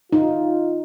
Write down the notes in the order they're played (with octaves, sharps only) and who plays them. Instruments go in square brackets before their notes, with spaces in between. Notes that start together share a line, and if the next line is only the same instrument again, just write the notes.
[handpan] D#4 [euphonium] F4